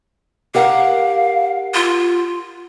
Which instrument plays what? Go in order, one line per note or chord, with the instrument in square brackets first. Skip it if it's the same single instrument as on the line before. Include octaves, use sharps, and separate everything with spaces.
[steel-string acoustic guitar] G4 A#4 F#5 [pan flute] F5
[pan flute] F4